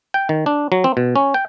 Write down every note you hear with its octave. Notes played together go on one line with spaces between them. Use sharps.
G5
D#3
D4
F#3
C4
B2
C#4
G5